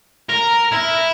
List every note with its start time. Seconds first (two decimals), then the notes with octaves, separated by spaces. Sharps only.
0.29 A#4
0.72 E4